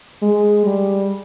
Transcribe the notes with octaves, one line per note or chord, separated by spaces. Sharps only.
G#3
G3